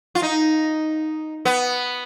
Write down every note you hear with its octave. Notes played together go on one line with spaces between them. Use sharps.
F4
D#4
B3